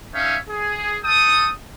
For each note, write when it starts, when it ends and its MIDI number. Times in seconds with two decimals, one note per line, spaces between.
0.14 0.36 61
0.14 0.36 63
0.14 0.36 73
0.14 0.36 76
0.14 0.36 77
0.49 0.96 68
1.03 1.49 69
1.03 1.49 79
1.03 1.49 87